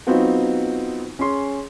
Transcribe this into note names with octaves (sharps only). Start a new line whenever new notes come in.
F#3 B3 C4 D#4 F4
C#4 G#4 C6